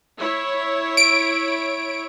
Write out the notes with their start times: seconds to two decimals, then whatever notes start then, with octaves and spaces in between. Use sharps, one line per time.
0.18 E4 C#5
0.97 D7